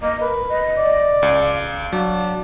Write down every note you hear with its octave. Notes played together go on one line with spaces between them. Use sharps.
A#3 D#5
A#4 B4
D#5
D5
C#2 F5
F#3 D4